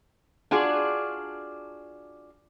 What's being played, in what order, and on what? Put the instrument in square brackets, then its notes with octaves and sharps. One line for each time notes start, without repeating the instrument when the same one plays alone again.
[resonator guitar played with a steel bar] D4 F4 F#4 G#4 D5